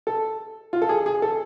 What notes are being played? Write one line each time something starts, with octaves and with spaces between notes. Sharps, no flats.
A4
F4
A4
G#4
G#4
A4